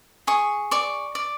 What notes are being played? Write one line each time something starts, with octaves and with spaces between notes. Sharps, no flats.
G#4 C#6
D5 C#6
D5